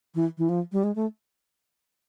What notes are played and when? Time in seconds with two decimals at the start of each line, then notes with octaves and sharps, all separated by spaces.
0.15 E3
0.38 E3
0.49 F3
0.72 G3
0.84 G#3
0.96 A3